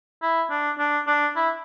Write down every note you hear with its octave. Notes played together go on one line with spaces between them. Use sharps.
E4
D4
D4
D4
E4